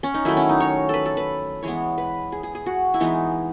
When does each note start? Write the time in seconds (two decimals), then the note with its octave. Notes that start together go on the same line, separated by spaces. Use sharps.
0.03 C#4
0.14 D#4
0.25 D#3 F#3 A3 E4
0.37 C#4
0.49 D#4
0.60 C#5
0.89 A4 B4
1.06 A4
1.17 B4
1.63 E3 G#3 B3 C#5
1.98 B4
2.32 G#4
2.43 G#4
2.55 G#4
2.66 F#4
2.94 E4
3.00 E3 G#3 B3 D#4